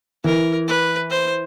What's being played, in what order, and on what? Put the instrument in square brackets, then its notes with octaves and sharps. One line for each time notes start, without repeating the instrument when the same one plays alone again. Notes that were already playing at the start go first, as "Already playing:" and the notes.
[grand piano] E3 [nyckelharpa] A#4
[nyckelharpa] B4
C5